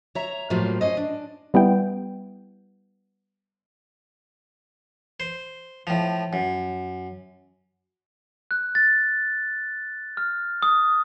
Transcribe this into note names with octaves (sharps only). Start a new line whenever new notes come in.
C#5 E5 A#5
A2 F3 F#3 A#3 F4 G4
C#4 C5 D#5
D4
G3 B3 E4 G5
C5
A2 F3
F#2
F#6
A6
F6
D#6